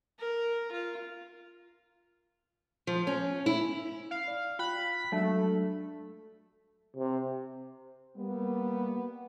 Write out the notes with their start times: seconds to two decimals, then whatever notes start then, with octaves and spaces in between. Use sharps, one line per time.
0.19 A#4
0.71 F4
2.87 F3
3.07 C#4
3.46 E4
4.11 F5
4.28 D5
4.59 F4 G5 B5 F#6
5.12 F#3 G#3 A3 D4
6.96 C3
8.17 G3 A#3 B3